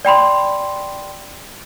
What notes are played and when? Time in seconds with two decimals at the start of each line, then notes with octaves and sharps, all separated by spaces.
0.05 D5 G5 B5 C6